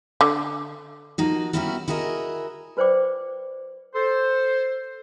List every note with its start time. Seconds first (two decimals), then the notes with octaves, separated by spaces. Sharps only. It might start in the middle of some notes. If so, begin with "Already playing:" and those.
0.21 D3
1.18 F3 A#3 D#4 F#4
1.53 G3 A#3 B3 C#4 E4 F#4
1.88 E4 F#4 G#4 A#4 B4 D#5
2.77 F4 B4 C5 D5 G5 D6
3.95 A4 C5